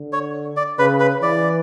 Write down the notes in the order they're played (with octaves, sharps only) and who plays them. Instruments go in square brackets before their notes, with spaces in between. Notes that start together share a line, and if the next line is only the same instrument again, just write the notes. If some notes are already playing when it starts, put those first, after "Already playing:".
Already playing: [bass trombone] D3
[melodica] C#5
D5
[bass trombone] C#3 [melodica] B4
[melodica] B4
[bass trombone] E3 [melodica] D5